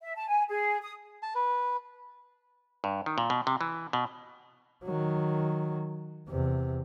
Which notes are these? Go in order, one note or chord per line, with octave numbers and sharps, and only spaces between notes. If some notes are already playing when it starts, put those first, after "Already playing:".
E5
A5
G#5
G#4
D#6
A5
B4
G2
D#3
A#2
B2
C3
E3
B2
D#3 F#3
E2 C3